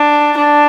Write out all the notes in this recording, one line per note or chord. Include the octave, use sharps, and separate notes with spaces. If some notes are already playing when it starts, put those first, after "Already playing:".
Already playing: D4
D4